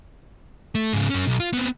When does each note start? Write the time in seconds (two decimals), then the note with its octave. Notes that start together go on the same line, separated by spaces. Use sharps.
0.75 A3
0.93 G#2 C#3
1.10 F#2 C#4
1.27 B1
1.40 F4
1.53 B3 C4